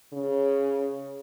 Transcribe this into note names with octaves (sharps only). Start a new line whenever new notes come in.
C#3